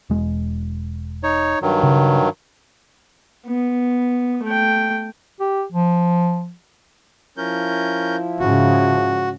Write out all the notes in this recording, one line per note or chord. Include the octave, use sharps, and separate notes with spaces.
E1 G#3
D#4 C#5
G2 D#3 F#3
C#3
B3
A3 G5
G4
F3
F3 C#4 E4 A#4 G6
G#2 C#3 F#4